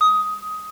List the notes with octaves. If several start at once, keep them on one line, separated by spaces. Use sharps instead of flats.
D#6